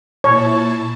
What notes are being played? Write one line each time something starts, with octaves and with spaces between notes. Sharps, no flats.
A#2 E4 C#5 A5